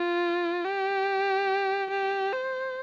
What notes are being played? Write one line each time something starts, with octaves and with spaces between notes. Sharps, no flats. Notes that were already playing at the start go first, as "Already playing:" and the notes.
Already playing: F4
G4
G4
C5